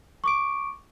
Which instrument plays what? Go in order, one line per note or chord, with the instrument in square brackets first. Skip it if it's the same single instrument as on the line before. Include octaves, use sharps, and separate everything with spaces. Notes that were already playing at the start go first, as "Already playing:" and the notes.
[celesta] C#6 D6 D7